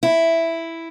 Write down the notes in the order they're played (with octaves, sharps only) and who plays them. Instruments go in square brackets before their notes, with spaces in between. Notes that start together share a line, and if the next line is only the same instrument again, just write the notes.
[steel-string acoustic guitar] E4